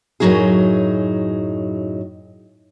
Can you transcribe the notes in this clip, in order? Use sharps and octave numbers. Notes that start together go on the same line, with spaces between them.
F#2 A2 D#3 F#3 D#4 G#4